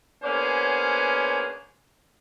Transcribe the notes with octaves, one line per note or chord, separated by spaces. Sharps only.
A#3 B3 C#4 D4 G#4 C5